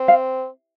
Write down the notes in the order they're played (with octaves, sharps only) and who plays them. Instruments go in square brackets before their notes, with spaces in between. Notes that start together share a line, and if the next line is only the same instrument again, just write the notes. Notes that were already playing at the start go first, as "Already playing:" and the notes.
Already playing: [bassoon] C4
[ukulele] F5